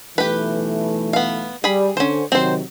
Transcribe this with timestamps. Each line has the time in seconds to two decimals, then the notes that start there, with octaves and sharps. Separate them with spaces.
0.18 B1 E3 A3 G4 B4
1.13 B3 F5
1.64 G3 G#4 B5
1.97 D3 C#4 C5
2.32 C3 D#3 F#3 C4 C5